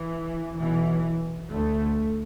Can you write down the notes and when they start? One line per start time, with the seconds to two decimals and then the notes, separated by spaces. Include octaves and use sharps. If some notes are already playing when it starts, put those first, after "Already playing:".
Already playing: E3
0.58 B1 B2 E3
1.50 D2 A3